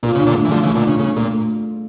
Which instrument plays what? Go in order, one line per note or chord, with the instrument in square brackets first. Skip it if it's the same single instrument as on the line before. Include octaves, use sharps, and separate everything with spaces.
[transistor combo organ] A#2 [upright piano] F4
[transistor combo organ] C#3
[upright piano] D4
[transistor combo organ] A#2 D3
[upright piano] A3
[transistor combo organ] E3
[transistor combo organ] D3 F3 [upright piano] A3
[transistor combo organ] C#3 E3
[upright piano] F4
[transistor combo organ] A#2 D3
[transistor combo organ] C#3 [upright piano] D4
[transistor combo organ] C#3 [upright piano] A3
[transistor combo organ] A#2 [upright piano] A3